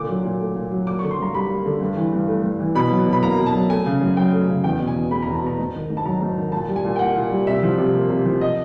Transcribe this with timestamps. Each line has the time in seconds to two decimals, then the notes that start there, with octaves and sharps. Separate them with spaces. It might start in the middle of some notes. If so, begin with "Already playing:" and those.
Already playing: A#2 D3 D6
0.09 F#3
0.24 A#2
0.40 A3
0.55 A#2
0.71 F#3
0.86 A#3 D6
0.99 D3 C#6
1.11 C6
1.18 G2 A#5
1.34 G3 B5
1.49 A#3
1.66 D3
1.81 G2
1.96 E3
2.13 G2
2.28 A3
2.44 G2
2.59 E3
2.75 B2 B5
2.90 F#3
3.06 B2
3.13 B5
3.23 A#3 A#5
3.39 B2
3.46 A5
3.54 F#3
3.70 A3 G#5
3.86 C#3
4.01 F#2
4.17 F#3 G5
4.33 A3
4.48 C#3
4.64 E2 G5
4.79 B2
4.87 G#5
4.95 E2
5.11 G#3 B5
5.22 E2 A#5
5.34 A5
5.43 B2 A#5
5.58 G#2
5.74 D#3
5.90 G#2
5.97 A5
6.06 F#3 A#5
6.21 G#2
6.37 D#3
6.52 A#2 A5
6.68 G3
6.76 G#5
6.84 A#2
6.96 G5
6.99 A#3 F#5
7.16 A#2
7.31 G3
7.47 C3 E5
7.63 F3
7.78 C3
7.94 A#3
8.10 C3
8.25 F3
8.41 D#5